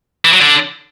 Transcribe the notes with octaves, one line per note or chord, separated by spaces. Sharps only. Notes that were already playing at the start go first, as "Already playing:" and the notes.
E3
F#3
D3